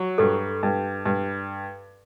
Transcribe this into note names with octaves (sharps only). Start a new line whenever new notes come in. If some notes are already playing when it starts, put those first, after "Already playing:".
Already playing: F#3
G2 A4
G2
G2